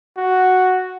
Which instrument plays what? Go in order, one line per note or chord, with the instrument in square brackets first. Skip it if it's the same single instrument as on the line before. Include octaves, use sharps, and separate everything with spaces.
[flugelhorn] F#4